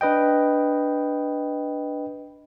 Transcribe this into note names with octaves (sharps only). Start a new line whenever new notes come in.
D4 B4 D#5 G5